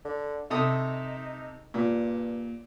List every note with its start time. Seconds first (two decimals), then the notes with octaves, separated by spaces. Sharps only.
0.05 D3
0.51 C3 D#4 A4 D#6
1.74 G2 A#2